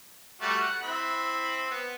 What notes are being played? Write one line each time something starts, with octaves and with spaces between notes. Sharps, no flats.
G3 A3 F#4
F#5
C4 E4 B5
B3